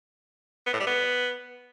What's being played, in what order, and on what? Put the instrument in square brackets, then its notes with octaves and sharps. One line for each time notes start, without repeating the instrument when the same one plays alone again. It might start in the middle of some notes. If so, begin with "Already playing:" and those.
[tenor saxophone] B3
A2
G3
B3